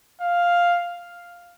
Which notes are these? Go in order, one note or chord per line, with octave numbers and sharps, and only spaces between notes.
F5